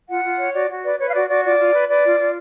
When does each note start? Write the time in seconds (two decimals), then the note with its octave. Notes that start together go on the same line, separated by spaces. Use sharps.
0.09 F4 F#5
0.24 F4
0.39 C#5
0.54 F#4 D5
0.69 F#4
0.84 B4 D5
0.99 B4 C#5
1.08 F5
1.14 F#4 D5
1.29 F#4 D5
1.44 F4 D5
1.59 F4
1.74 B4
1.89 B4 D5
2.04 F4
2.19 F4